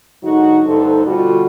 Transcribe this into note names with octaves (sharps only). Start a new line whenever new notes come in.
G#2 D3 F#3 D#4 F#4
D2 G2 D3 D#4 A4 C5
B2 D3 G3 F4 F#4